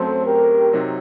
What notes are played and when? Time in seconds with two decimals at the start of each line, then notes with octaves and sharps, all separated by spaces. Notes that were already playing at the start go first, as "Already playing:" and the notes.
Already playing: F#2 F#3 A3 C4 A4 C5
0.25 G4 A#4
0.73 C3 F#3 C4 D#4